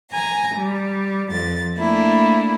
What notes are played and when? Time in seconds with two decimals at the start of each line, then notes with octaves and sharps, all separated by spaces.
0.11 G#5 A#5
0.56 G3
1.30 F2 A6
1.76 A3 A#3 D4 E4